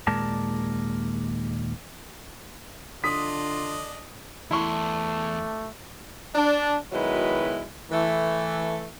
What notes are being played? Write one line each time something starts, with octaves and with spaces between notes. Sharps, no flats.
D#2 A#2 G#3 A#4 D5 A5
D3 D4 F4 D#5 D#6 B6
E2 A3 D4 E4 C6 C#6
D4
B2 D#3 F#3 G#3 E4 B4
E3 A3